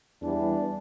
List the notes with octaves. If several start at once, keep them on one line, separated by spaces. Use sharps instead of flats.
E2 E3 G3 D4